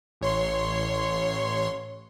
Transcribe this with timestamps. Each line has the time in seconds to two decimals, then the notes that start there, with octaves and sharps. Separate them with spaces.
0.21 A1 C#5 C6